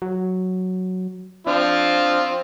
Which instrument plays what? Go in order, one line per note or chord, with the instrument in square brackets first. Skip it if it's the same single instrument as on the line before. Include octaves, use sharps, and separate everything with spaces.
[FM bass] F#3
[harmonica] F3 C4 F4 [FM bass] D4